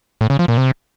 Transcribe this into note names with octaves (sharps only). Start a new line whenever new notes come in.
A2
C#3
F3
A#2
C3